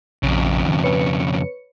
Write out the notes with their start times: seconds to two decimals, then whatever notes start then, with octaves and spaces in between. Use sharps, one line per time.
0.23 A#1 F2 C#3
0.65 D#3
0.84 B4 C#5 C#7